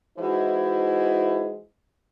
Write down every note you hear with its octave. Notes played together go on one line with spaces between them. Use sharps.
E3 G#3 D#4 E4 F#4 C5